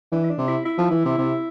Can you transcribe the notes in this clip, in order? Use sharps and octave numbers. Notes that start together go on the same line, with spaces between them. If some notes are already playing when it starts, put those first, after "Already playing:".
E3 D4
E4
D4
C3
E4
E4
F3
E3
C3
C3